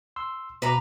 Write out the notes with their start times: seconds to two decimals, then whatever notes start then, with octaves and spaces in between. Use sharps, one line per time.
0.16 C6 E6
0.62 B2 B4 A#5 D6